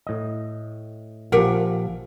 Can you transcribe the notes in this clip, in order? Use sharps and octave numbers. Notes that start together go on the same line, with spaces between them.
A2 D#5
A#1 F3 G4 A#4 F#5